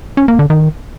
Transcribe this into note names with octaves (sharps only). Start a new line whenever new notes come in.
C#4
A#3
D3
D#3